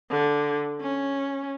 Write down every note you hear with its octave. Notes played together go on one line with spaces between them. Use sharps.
D3
C#4